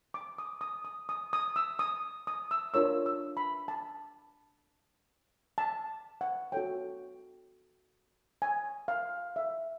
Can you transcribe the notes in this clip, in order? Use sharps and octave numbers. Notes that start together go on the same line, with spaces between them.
D6
D#6
D#6
D#6
D#6
D#6
E6
D#6
D#6
E6
D4 F4 A#4 C#5 E6
E6
B5
A5
A5
F#5
F#4 A4 C#5 G5
G#5
F5
E5